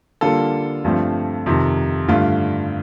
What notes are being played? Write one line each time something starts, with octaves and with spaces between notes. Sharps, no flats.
D3 G3 A#3 F4 A4
G2 F3 A3 C4
F2 C3 D#3
G2 D3 A3 F4